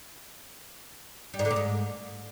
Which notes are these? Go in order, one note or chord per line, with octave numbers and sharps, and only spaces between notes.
G3
G#2
D3
A#2
G#2